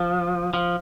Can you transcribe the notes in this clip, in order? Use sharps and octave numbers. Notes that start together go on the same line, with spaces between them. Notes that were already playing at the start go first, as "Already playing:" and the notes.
Already playing: F3
F3